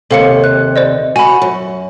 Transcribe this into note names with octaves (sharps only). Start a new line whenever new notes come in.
D#2 G#2 C3 A4 F5 C#7
F#6
C5 D5 D#5
F#4 G#5 B5
F#2